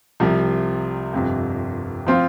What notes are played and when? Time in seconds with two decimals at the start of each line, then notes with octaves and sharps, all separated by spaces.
0.20 C2 C3 F3
1.13 G1 F2 C3
2.06 F3 C4 F4